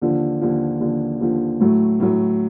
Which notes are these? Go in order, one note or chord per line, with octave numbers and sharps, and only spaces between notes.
D#2 D3 F3
D#2 D3 F3
D#2 D3 F3
D#2 D3 F3
A2 F#3 A3
A2 F#3 A3